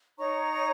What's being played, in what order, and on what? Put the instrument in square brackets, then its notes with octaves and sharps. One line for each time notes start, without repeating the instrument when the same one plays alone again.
[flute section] D#4 C#5 A#5 C#6